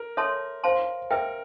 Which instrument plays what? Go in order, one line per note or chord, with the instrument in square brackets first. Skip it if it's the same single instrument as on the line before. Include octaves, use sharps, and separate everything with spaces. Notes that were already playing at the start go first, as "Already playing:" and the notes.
Already playing: [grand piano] A#4
[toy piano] A4 C#5 E5 A5 C6
C5 F5 A5 C6
[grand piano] A#4 [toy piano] B4 E5 G5